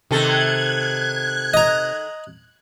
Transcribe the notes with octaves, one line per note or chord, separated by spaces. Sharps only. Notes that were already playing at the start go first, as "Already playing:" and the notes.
C3 D#3 A4 F#6 G#6
D#5 A#5